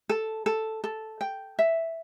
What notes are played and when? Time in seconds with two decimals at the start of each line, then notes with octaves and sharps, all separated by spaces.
0.09 A4
0.46 A4
0.84 A4
1.21 G5
1.59 E5